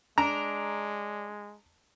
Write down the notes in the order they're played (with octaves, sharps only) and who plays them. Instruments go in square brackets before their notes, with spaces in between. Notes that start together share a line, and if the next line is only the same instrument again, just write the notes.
[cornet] G#3 [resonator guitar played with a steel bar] D4 [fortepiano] A#5